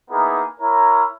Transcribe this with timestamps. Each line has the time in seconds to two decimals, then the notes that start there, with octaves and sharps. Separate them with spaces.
0.10 A#3 B3 D#4 E4 G#4 A#4
0.60 E4 A#4 C#5 A#5